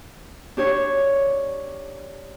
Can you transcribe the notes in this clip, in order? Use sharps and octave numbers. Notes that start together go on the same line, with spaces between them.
D4 G4 C#5